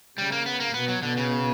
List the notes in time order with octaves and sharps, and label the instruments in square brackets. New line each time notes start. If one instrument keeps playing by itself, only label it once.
[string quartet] C#3 [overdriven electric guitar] G3
[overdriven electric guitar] A#3
B3
A#3
[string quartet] B2 [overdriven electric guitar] B3
[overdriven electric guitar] F#3
[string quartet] B2 [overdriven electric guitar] D3
[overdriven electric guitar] C#3